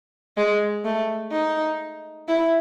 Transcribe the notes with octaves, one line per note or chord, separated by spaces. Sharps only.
G#3
A3
D#4
E4